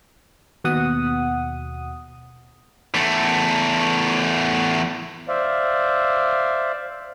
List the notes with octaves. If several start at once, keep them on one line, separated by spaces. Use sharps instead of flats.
D#2 B2 F#5 D#6
E2 A3
C5 D5 E5 F5